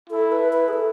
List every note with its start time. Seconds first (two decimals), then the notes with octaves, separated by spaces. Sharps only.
0.10 E4 A4
0.32 B4
0.53 B4
0.68 G#4
0.74 A4